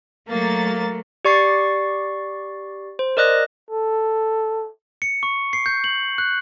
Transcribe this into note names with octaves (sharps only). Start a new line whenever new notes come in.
F#3 A3 A#3 A6
G4 D5 C#6 A6 C7
C5
A#4 D5 D#5 F#6 A#6
A4
C#7
C#6
C7
G6
F#7
F#6